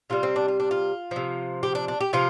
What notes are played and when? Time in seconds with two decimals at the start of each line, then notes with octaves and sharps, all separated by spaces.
0.10 C3 G3 F4
0.23 C4
0.36 D4
0.48 F4
0.60 D4
0.71 F4
1.11 C3 F3
1.63 G4
1.75 D4
1.88 D4
2.01 G4
2.13 C3 F3 F4